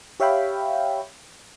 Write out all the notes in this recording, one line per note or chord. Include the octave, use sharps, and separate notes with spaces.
G4 C#5 E5 F5 G5 B5